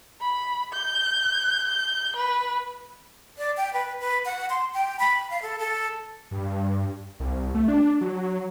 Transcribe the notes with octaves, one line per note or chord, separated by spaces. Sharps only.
B5
G6
G6
B4
D5
G5
B4
B4
F#5
C6
G5
B5
F5
A4
A4
G2
C2
A3
D4
F#3